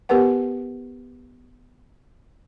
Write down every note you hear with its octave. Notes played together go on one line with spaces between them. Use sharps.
B3 G4 A#4 B4 F#5